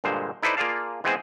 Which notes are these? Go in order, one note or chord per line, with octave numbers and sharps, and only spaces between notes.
G2 A#2 D3 G#3 C5
D#4 E4 A4 B4 C5 D5
A#3 F4 G#4 D5 F5 A5
E3 G#3 B3 C4 G#4 C5